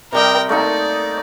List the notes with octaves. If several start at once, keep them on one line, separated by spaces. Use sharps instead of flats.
C3 G3 A#4 D#5 G5
A3 A#3 D#4 D5